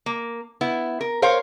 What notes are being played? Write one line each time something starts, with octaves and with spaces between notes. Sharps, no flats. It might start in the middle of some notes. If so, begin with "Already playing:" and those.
A#3
B3 E4
A#4
A#4 C5 C#5 F5